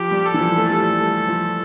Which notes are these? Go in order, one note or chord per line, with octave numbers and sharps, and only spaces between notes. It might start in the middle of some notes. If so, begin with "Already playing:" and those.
Already playing: F3 G4
G3
A4
E3
F3
A3
G3 A4
G3
A3
F3